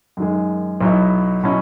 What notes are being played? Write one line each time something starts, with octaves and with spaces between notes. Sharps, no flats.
F#2 D#3 G#3
B1 B2 F#3 B3 E4
B2 F#3 C#4 E4